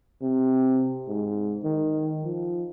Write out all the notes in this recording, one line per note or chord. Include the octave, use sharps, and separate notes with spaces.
C3
G#2
D#3
F3